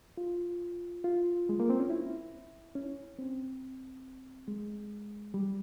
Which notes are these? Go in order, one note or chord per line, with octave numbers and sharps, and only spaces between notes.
F4
F4
G#3
A#3
C4
C#4
E4
C#4
C4
G#3
G3